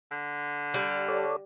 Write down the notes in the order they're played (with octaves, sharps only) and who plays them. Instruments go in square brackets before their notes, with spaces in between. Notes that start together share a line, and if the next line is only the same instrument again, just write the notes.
[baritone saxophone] D3
[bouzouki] G3
[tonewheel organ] A4 C#5 D5